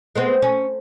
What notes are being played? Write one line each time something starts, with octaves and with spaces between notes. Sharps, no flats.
G#3 B3 C4
C#4